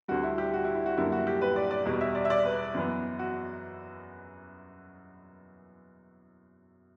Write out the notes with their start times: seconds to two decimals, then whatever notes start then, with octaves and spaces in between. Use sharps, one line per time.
0.08 D2 D3 G3 F#4
0.23 E4
0.38 G4
0.54 F#4
0.64 E4
0.75 E4
0.86 F#4
0.97 F#2 D3 G3 A#3 E4
1.12 F#4
1.27 G4
1.41 B4
1.56 D5
1.71 D5
1.86 E2 B2 G3
2.01 E5
2.15 D5
2.25 E5
2.30 D5
2.45 B4
2.75 F#2 E3 B3
3.19 F#4